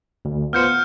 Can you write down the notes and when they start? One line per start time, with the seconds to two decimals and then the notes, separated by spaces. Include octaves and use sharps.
0.25 D2
0.53 B3 F4 C5 F6 G6 C#7